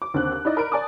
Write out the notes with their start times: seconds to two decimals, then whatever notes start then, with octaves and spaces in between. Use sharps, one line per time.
0.02 D6
0.14 D#2 D3 C4 F#6
0.32 F#6
0.45 D#4 E4 D5 D#5
0.57 A#4 B5 D7
0.72 D5 G#5 A5 D6 D#6